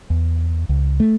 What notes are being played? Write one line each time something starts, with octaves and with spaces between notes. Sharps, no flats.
E2
C#2
A3